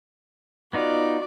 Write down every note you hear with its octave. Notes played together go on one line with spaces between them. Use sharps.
B3 D#4 F4 F#4 D5